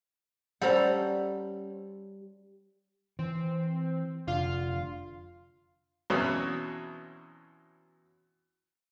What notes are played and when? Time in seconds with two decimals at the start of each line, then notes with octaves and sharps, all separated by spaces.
0.61 G3 C#4 A4 C5 F#5 A#5
3.19 E3 C4
4.27 F1 D3 F4 F5
6.10 E2 B2 E3 F#3 C4 C#4